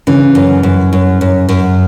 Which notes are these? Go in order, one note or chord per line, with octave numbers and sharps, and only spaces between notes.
C#3 E3
F#2
F#2
F#2
F#2
F#2